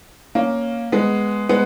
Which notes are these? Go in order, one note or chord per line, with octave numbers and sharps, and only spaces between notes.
A#3 C#4
G#3 B3
G#3 B3